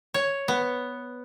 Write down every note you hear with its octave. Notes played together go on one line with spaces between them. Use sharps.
C#5
B3